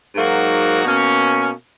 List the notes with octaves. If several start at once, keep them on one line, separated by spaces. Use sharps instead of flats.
G#2 F#3 A#3 D#4 F#4
B2 A#3 C#4